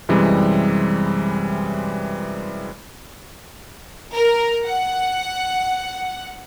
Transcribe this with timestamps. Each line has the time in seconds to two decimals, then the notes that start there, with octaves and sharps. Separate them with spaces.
0.09 F#2 C3 E3 G3 G#3
4.14 A#4
4.66 F#5